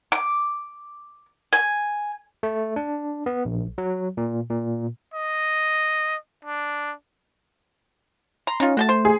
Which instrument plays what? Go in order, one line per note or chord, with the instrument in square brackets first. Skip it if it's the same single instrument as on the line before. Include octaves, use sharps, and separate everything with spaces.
[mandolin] D6
G#5
[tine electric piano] A3
D4
B3
A#1
F#3
A#2
A#2
[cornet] D#5
D4
[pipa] A#5 [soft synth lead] C6
[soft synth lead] C#4 [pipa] D#4 F4
[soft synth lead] A3 [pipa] F#4 G5 A5
[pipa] C5
[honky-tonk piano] G#4